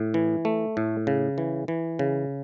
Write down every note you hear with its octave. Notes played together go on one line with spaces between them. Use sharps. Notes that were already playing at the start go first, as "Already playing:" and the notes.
Already playing: A2
E3
A3
A2
C#3
E3
E3
C#3